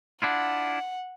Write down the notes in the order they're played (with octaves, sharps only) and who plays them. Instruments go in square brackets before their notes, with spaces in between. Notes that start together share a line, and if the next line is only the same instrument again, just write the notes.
[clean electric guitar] D4 E4 F4 [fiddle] F#5